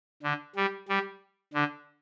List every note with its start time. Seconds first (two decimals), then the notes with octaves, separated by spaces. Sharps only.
0.23 D3
0.56 G3
0.89 G3
1.54 D3